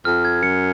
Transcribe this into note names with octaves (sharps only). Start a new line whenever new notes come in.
F2 F6
G#6
F#2 C#7